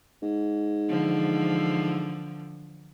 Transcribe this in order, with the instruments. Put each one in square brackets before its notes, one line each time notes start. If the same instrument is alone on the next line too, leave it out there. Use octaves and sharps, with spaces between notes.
[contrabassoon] G#2
[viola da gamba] D3 E3 F3